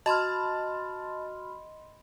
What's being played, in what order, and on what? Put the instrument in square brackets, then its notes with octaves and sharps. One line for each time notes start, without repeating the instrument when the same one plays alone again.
[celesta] F#4 F6 [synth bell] D#5 B5 C6 [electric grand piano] A5